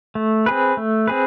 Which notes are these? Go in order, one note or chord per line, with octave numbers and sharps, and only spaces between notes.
A3
C4 G#4 B4
A3
C4 G#4 B4